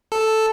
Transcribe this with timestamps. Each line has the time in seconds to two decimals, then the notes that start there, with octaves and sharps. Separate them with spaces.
0.12 A4